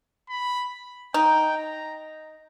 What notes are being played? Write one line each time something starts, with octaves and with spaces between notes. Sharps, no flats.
B5
D#4 G5
A#5